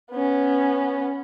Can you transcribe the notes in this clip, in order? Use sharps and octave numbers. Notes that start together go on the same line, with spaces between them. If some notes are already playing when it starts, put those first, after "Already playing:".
B3 C#4